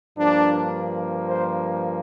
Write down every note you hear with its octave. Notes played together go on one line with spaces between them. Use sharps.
G2 F3 A#3 D4
C5